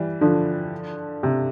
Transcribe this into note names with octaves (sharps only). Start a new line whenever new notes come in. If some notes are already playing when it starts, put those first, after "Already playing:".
Already playing: E3 G3
D3 F3
C3